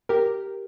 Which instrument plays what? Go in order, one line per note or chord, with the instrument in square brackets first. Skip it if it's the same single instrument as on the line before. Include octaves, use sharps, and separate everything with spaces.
[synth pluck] G4 A#4